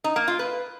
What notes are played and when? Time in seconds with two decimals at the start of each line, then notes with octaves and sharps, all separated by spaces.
0.04 D#4
0.16 A#3
0.28 F4
0.39 B4